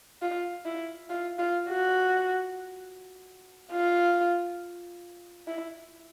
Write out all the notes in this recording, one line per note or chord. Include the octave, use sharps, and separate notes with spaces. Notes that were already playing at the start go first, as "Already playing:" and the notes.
F4
E4
F4
F4
F#4
F4
E4